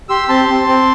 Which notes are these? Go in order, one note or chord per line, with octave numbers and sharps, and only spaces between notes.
G4 C6 E6
C4 A5 C6
C4
C4